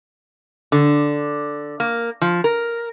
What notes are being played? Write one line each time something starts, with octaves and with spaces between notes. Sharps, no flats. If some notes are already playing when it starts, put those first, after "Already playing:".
D3
A#3
F3
A#4